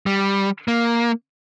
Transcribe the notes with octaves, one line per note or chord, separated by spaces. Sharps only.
G3
A#3